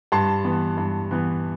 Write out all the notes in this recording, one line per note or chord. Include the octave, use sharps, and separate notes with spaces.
G2 A5 C6
E3 B3
G2
E3 B3